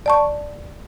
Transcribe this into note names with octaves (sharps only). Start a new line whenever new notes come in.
D5 A5 C#6